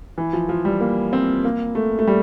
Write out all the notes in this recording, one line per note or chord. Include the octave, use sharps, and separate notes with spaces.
E3
F3
F3
G3
A#3
C4
A#3
A3
A3
G3